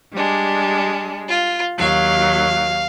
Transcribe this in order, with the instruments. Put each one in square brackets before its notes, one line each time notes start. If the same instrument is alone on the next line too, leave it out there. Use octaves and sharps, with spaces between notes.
[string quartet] G3 G#3 D4
[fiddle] F4
[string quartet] D#2 F#3 [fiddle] F5